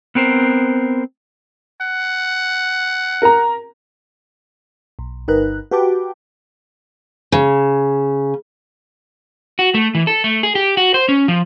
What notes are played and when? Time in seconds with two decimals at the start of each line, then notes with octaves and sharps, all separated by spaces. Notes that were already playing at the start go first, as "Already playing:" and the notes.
0.15 B3 C4 A#4 C5
1.82 F#5
3.22 A#4 A#5
4.99 B1
5.28 G1 D#4 A#4 B4 F#6
5.71 F#4 G4 B4 G5 A5 D6
7.32 C#3
9.59 F#4
9.74 A3
9.95 E3
10.07 A4
10.24 A3
10.43 G#4
10.55 G4
10.77 F#4
10.94 C5
11.09 C#4
11.28 F3